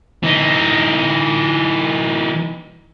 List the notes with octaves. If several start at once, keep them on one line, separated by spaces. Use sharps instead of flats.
E3 D#4